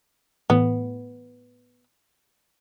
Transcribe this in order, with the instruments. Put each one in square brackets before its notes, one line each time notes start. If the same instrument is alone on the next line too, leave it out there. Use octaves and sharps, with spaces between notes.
[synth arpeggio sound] A2 E3 [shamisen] B3